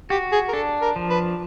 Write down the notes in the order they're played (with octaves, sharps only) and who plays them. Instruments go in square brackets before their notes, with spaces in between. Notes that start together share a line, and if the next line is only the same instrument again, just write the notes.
[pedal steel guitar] F#4 [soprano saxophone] G4
[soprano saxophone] G#4
A#4
[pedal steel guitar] D4 [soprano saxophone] A4
[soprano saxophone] A#4
[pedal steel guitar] F3
[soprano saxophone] B4